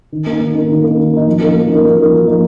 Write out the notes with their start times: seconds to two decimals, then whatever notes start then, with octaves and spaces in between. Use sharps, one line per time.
0.12 D#3
0.26 A#3 D#4
0.41 D#3
0.55 A#3 D#4
0.69 D#3
0.84 A#3 D#4
0.98 D#3
1.13 A#3 D#4
1.27 F3
1.41 A#3 D#4 A#4
1.55 F3
1.69 A#3 D#4 A#4
1.84 F3
1.98 A#3 D#4 A#4
2.13 F3
2.27 A#3 D#4 A#4